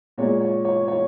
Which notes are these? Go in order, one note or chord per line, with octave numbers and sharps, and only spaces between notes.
A#2 G#3 C#5
C#5
C#5
C#5